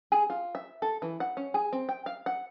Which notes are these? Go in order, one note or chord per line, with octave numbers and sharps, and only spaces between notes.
G#4
F4
E5
A4
E3
F#5
C#4
G#4
C4
G5
F5
F#5